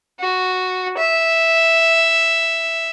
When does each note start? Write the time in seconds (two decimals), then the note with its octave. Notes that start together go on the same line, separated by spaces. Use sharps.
0.20 F#4
0.97 E5